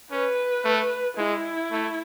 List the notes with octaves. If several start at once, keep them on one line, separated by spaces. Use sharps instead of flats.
C#4 B4
A3
G#3 E4
A3